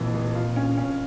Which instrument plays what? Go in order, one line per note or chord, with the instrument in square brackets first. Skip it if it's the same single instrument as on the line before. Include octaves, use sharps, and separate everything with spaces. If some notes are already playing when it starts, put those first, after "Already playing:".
Already playing: [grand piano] F1 F2 E3 [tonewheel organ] A#2
[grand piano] F1
F4
C#4
C#4